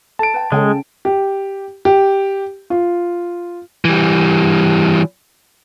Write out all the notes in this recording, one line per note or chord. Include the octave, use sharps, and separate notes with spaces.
A4 A5 D7
B4 G5
C#3 G#3 A4 G5 G#5
G4
G4
F4
E3 G3